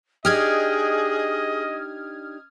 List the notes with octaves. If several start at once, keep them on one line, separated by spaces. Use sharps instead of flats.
D4 D#4 G4 G#4 D#5 D#6 F6 G#6